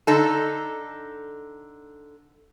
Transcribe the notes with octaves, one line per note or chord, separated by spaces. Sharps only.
D3 D#4 A4